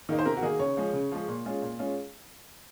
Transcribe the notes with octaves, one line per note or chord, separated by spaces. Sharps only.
D#3 A#3 D#4
C5
C3 A#4
F#4
D#3 A#3 D#4 G#4
C#3 C#5
F3 G#3
C#3
F3 G#3
A#2
G#3 C#4 F4
A#2
G#3 C#4 F4